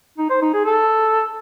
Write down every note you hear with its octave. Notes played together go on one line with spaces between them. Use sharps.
D#4
C5
D#4
G#4
A4